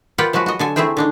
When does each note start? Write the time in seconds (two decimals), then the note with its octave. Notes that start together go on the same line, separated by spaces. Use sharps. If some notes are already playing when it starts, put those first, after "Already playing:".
0.18 F4 A#4 B4 D5 F#5 G5
0.33 F3 F#3 G#3 F#4 B4
0.46 F#4 D#5
0.59 D3 A4 G#5
0.76 A3 C4 E4 G#4 C5 G5
0.97 D3 D4 D#4